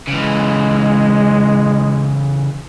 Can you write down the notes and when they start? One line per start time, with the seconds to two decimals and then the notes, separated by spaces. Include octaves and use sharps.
0.08 C#3 E3 G#3